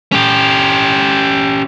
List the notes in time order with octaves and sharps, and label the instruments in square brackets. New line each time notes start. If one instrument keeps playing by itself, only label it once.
[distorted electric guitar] C#4 G4